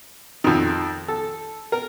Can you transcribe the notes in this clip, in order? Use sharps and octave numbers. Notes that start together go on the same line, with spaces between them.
F2 D#3
A4
A#4